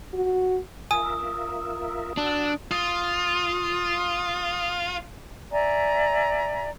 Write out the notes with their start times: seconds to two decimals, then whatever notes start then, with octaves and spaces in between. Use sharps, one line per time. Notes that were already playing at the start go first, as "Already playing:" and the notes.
0.13 F#4
0.91 F4 A#4 E5 G#5 D#6
2.17 D4 F#4 E6 F#6
2.71 F4 D#6
5.52 D5 E5 G#5 A#5